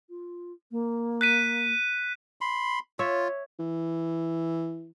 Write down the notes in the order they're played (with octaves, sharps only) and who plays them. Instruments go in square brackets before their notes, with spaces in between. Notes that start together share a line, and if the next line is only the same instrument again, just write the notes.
[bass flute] F4
A#3
[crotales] F#6 B6 D#7
[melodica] B5 C6
[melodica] F4 [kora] C#5 E5
[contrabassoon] E3